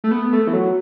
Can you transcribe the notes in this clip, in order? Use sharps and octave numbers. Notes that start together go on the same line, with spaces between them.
A3
B3
A3
E3
F#3